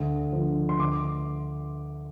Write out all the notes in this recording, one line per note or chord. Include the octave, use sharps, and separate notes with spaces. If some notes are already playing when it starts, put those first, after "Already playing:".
Already playing: D2
D3 F3
C6
D2 D6